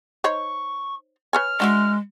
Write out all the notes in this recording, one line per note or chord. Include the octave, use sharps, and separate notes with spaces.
D#4 C5 C#5 C#6
B4 C#5 G#5 F6
G#3 D4 F#4 E5